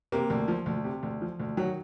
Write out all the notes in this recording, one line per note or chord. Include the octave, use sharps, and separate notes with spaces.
C3 A#3
D2
F3
D2
C3
D2
F3
D2
D#3 F#3